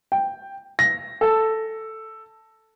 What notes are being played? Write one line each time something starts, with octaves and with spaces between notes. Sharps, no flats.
G5
A#6
A4